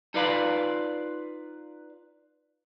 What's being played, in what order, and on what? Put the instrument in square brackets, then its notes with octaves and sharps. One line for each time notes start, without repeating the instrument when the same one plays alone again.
[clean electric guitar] D#4 F4 B4 D5 F5 B5